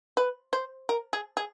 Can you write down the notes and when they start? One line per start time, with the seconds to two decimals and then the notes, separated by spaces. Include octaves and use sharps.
0.17 B4
0.53 C5
0.89 A#4
1.13 G#4
1.37 G#4